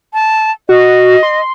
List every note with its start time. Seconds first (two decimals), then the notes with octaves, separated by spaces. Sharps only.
0.13 A5
0.69 F#4 D#5
1.23 C6